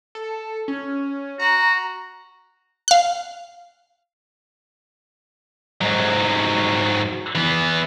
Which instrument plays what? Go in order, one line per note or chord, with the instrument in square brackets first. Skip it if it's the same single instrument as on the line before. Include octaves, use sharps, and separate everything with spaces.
[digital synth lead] A4
C#4
[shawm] F#4 [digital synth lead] A#5
[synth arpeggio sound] F5 F#6
[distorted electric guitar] G#2 F#3
E3 B3